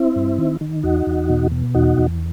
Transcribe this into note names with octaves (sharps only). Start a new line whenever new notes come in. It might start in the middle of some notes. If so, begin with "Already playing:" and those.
Already playing: C4 E4
G2
D#3
D#3
E2 D#4 F#4
E2
B2
B2
E2 D#4 F#4
E2